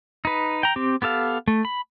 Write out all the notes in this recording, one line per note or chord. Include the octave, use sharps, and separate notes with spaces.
D#4 B4
G5 A#5
C4 G4
B3 G4 A4 F5
A3
B5